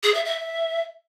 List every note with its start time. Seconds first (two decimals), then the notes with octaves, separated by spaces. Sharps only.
0.03 G#4
0.14 E5
0.25 E5